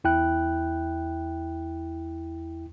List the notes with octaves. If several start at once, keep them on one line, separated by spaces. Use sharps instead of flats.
E2 E4 G5 F#6